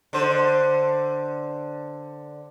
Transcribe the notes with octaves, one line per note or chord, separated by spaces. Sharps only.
D3 C5